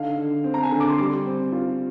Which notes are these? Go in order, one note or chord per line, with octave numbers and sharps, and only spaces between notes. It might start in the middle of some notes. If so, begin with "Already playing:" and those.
Already playing: D3 D#4 F5
D3
C4
A#5
G#5
D3
D6
C6
G3 D6
C4
F4